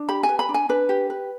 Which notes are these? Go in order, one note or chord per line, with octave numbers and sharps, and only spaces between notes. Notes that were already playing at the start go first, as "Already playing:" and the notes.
Already playing: D4
G4 B5
G#5
B4
B5
D4
G#5
D4 B4
G4
B4